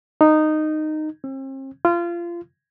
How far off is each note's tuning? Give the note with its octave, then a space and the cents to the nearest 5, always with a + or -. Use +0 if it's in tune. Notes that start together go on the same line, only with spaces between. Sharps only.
D#4 -10
C4 +40
F4 -25